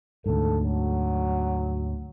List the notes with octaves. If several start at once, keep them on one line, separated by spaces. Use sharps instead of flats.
D2 G#2 A4
F#3